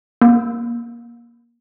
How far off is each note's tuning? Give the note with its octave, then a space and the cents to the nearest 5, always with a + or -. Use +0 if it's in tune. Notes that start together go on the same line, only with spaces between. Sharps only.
A#3 +20